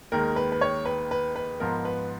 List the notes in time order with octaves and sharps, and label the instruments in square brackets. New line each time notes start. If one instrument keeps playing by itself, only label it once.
[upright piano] D#2 D#3 G#3 A#4
B4
B4
C#5
B4
B4
B4
G#2 F3 B3 A#4
B4